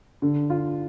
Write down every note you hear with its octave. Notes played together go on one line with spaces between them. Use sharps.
D3
F4